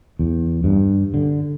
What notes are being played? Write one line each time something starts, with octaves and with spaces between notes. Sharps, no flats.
E2
G2
D3